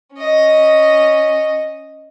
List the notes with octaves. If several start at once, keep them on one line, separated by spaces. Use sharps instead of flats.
C#4 D#5